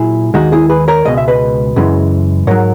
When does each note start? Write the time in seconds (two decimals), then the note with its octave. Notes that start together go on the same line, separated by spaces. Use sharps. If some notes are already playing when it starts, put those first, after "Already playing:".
Already playing: A#2 F#3 E4 G#4
0.34 D#2 D#3 G#3 D#4 F#4
0.52 E4 G#4
0.69 G#4 B4
0.88 A#4 C#5
1.05 C#2 B2 G#3 D#5
1.18 E5
1.28 B4 D#5
1.76 F#2 C#3 E3 G#3
2.47 G#2 F#3 A#4 C#5